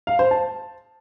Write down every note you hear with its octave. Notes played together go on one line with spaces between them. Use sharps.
F5
C5
A5